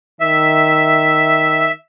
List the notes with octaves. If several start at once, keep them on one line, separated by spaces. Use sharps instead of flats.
D#3 E5